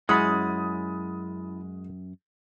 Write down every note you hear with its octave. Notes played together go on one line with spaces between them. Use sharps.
F#2 G#3 C#4 E4 F#5 B5 D#6 A6